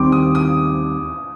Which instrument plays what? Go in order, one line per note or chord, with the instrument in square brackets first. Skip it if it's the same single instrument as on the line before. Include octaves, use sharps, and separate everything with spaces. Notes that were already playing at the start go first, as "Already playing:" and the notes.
Already playing: [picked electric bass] D#2 D#3 G3 C4 [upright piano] D6
[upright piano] D#6
D#6